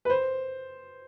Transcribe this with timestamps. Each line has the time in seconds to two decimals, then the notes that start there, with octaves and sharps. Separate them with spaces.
0.05 B4
0.10 C5